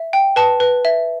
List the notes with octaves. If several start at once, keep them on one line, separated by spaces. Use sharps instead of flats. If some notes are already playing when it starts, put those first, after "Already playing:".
Already playing: E5
G5
B4 A5
B4
E5